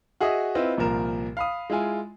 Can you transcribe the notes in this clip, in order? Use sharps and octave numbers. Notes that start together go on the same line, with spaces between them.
F#4 G#4 D#5 E5 D#6
C4 E4 F4 B4 D#5
C2 A#2 F3 A#4 E7
F5 B5 D#6
G#3 E4 F4 G#5